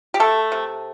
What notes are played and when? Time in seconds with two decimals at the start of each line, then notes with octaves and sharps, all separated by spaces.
0.14 G4
0.20 A3 A4
0.52 C3